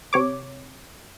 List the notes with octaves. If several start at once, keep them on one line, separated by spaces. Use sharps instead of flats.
C3 C#5 D6